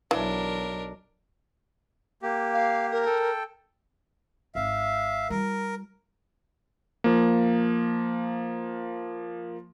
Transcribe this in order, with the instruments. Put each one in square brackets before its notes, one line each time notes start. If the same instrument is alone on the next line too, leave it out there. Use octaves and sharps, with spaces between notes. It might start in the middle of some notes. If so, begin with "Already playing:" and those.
[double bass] B1 [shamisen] E3 [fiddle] D4 A#4
[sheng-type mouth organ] A#3 G4
[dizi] F5
A#4
[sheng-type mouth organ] A4 G5
[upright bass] G#1 [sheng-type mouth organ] E5 F5
[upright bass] G3 F4 [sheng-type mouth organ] A#4
[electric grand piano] F3 A#3